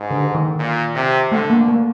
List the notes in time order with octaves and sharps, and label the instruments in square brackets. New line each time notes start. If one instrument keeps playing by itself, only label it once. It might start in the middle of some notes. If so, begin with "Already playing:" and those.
Already playing: [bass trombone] G#2
[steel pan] D3
D#3
[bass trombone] A#2
C3
[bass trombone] D3 [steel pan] A3
[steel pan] A#3
A#3